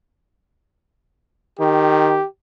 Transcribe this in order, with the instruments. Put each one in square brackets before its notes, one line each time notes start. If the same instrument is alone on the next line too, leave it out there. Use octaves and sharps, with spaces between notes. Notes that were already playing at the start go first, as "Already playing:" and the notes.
[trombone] D#3 [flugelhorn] G4